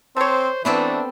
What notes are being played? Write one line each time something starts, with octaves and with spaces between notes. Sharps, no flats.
C4 A4 C5 C#5
E3 A3 B3 C4 D4 E4 A4